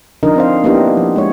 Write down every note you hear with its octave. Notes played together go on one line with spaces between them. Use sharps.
D3 F3 D4 D#4 A#4 D#5
C4 C5 F5
A#3 B3 D4 E4 G4 D#5
F3
G#3 C#5